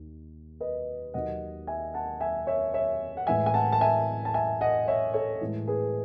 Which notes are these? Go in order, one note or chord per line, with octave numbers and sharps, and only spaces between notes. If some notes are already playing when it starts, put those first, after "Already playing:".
Already playing: D#2 D#3
B4 D#5
D#2 D#3 F#3 D#5 F#5
E5 G#5
F#5 A5
E5 G#5
C#5 E5
C#5 E5
F#5
A2 E3 G#3 E5 G#5
G#5
F#5 A5
A5
E5 G#5
A5
E5 G#5
D#5 F#5
C#5 E5
A4 C#5
A2 E3 G#3
G#4 B4